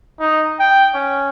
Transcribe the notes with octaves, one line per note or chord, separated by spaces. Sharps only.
D#4
G5
C#4